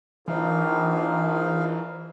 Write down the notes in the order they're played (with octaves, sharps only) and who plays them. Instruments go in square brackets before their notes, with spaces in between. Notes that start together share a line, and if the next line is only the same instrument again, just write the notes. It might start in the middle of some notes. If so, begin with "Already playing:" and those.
[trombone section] A#1 [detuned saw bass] E3 [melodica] D#4 F5